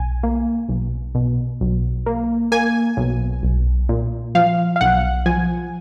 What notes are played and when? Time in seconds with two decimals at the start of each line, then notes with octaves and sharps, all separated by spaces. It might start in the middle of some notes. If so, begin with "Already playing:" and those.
Already playing: B1 G#5
0.23 A#3
0.69 B1
1.15 B2
1.61 B1
2.06 A#3
2.52 A#3 G#5
2.97 B1
3.43 B1
3.89 A#2
4.35 F3 F5
4.76 F5
4.81 B1 F#5
5.26 F3 G#5